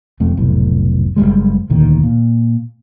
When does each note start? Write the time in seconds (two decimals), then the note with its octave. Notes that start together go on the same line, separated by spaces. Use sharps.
0.20 E1 F2 A3
0.37 F1 B1 A2
1.16 F#1 C#2 G3 G#3
1.70 E1 D2 A#2 D#3
2.03 A#2